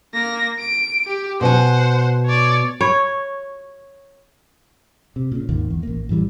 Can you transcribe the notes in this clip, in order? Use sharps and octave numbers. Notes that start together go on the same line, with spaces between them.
A#3 A#6
D7
G4
B2 C5 F#5 G#5
C#5 D5
C#5 B5 C#6 G#6
C3
A#2 C#3
G#1 D#2 D#3
E2
A1 A#3
A1 A2 E3 G3